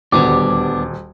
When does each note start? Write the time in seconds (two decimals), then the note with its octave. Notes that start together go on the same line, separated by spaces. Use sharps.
0.12 D#1 D2 G3 B3 D4 D6